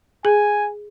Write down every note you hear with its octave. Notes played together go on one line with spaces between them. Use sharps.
G#4 G#5